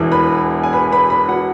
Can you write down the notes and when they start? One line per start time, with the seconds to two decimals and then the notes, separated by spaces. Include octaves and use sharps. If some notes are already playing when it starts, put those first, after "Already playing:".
Already playing: E1 E2 E3
0.12 B4 B5
0.63 G#5
0.73 B4 B5
0.92 B4 B5
1.10 B4 B5
1.28 F#4 F#5